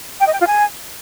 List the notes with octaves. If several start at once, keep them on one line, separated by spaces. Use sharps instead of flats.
G5
D#5
G5
F4
G#5